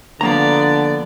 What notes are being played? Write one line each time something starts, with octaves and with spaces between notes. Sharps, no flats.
D3 F3 A#3 B3 D5 A#5